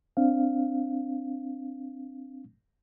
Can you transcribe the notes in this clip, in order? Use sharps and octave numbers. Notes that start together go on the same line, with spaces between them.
C4 D4 F5